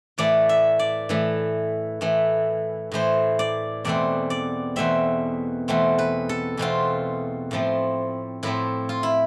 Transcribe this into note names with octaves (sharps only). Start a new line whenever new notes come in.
A2 E3 A3 D5
E5
D5
A2 E3 A3
A2 E3 A3
A2 E3 A3 C5
D5
E2 B2 A3 C4 D5
D5
E2 B2 A3 C4 E5
E2 B2 A3 C4
B4
A4
E2 B2 A3 C4 F4
A2 F3 A3 C4
A2 F3 A3 C4 E4
F4
E4